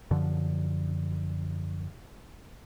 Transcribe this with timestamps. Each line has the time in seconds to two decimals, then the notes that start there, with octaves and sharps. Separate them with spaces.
0.11 F#2 D3 F3